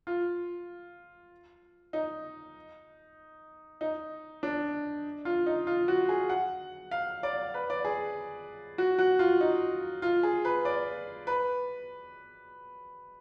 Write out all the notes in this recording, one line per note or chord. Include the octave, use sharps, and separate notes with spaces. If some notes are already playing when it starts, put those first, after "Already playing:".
F4
D#4
D#4
D4
F4
D#4
F4
F#4
G#4
F#5
F5
D5
B4
D5
G#4
F#4
F#4
F4
D#4
F4
G#4
B4
D5
B4